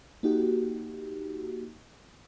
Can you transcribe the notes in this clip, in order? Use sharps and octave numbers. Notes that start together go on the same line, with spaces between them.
A#3 D#4 F#4 G4